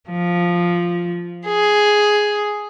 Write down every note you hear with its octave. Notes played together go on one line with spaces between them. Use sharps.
F3
G#4